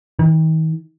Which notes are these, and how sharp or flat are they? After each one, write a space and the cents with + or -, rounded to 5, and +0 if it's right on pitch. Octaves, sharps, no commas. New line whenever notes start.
D#3 +40